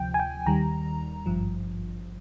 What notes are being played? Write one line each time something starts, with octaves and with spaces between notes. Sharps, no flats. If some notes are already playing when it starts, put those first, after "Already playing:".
Already playing: D2 C3 F3 G5
G#5
G5
D#2 D#3 G3 A#5
G#1 G2 F3